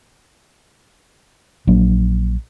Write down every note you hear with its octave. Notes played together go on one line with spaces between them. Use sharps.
A#1 F#3 A#3 D4